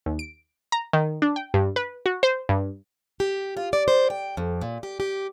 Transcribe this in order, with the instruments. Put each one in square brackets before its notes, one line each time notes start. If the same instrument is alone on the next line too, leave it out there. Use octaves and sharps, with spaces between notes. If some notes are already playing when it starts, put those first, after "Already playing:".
[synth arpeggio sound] D#2
D7
A#5
D#3
D4
G5
G2
B4
F#4
C5
G2
[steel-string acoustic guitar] G4
F4
D5
C5
G5
F2
A#2
G4
G4